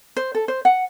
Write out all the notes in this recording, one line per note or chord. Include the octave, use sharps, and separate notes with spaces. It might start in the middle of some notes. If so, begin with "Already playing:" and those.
C5
A4
C5
F#5